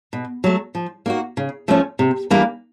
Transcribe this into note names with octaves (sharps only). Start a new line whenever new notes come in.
B2
F#3 A3
F3
A#3 D#4 F#4
C#3
F3 A3 C#4
C3
E3 G3 A#3 D4